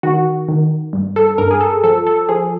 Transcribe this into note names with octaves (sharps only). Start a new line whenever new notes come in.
D#3 F#4
D#3
G2
A4
G2 A#4
G#4
A4
F3 A4
A4
F3 G#4